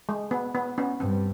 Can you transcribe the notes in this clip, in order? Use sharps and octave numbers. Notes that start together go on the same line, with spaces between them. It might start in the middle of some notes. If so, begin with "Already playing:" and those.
G#3
B3
B3
B3 C#4
G2 C4